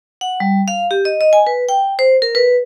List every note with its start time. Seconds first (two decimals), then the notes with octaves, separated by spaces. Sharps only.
0.21 F#5
0.40 G3
0.68 F5
0.91 G4
1.05 D#5
1.21 D#5
1.33 G#5
1.47 B4
1.69 G5
1.99 C5
2.22 A#4
2.35 B4